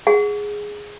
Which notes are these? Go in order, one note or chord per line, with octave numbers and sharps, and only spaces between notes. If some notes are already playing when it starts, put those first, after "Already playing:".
G#4 F#5